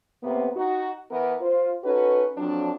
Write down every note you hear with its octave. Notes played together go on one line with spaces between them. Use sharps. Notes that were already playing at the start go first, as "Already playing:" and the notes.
A2 C3 A#3 B3
D#4 F#4
E3 B3 A#4 B4
F4 C5
C#4 D#4 F#4 A4 B4
F2 F#3 D4